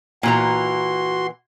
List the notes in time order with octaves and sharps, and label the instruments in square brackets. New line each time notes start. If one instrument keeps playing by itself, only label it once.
[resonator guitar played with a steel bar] A#2 E3 A#5 [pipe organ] F#4 C6